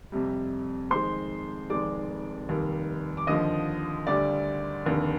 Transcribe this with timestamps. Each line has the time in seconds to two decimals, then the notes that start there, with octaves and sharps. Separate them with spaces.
0.12 F2 C3 G3
0.91 F2 D#3 G#3 C5 C6
1.70 F1 F2 D#3 G#3 D5 D6
2.48 F1 D#2 D#3 G3
3.17 D6
3.27 D#2 D3 F3 D#5 D#6
4.07 D2 D3 G3 D5 D6
4.85 F1 D#2 D3